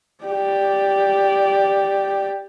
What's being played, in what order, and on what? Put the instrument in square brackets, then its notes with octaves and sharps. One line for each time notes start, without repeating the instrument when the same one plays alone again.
[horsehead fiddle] G4 D5